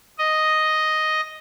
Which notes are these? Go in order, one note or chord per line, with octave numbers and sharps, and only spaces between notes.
D#5